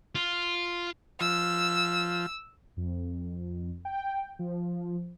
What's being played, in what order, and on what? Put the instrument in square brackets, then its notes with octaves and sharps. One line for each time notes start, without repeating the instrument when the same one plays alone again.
[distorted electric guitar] F4
[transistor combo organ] F3 [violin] E6
[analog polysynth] F2
G5
F3